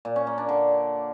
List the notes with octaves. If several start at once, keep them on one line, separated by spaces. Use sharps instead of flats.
A#2
C#4
A#3
D4
D3